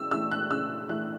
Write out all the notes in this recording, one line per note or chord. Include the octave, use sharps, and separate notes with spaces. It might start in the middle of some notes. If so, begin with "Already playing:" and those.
Already playing: C#3 E3 E6
E3 A3 E6
F#6
C#3 E6
E3 A3 F#6